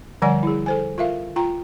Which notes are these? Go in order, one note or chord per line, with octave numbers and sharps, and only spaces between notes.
D3 F3 G3 D5 F#5 G#5
E4 G#4
A4 C5 G#5
F4 A#4 E5 F5
F4 G5 A#5